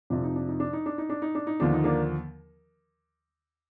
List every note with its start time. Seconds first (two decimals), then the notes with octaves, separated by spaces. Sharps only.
0.10 F2 C3 F3 D4
0.23 D#4
0.36 D4
0.48 D#4
0.60 D4
0.73 D#4
0.86 D4
0.98 D#4
1.09 D4
1.22 D#4
1.35 D4
1.47 D#4
1.60 D#2 D3 F3 D4
1.73 D#4
1.84 A#3 D4